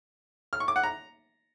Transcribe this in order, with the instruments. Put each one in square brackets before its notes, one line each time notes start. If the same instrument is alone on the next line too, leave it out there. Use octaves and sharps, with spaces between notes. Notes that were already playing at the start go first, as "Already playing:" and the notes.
[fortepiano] F6
C#6
D6
F#5
A#5